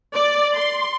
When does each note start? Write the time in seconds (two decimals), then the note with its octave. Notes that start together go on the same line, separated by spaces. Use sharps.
0.16 D5
0.56 C6